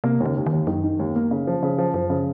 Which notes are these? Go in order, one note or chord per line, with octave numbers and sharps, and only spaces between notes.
C3 A#3
D#2
C#3
D#2
D#3
D#2
F#2 D#3
D#3
D#2
A#3
C#3
F3
C#3
F3
F#2 F3
C#3